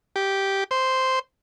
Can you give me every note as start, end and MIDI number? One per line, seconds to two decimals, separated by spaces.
0.16 0.64 67
0.71 1.19 72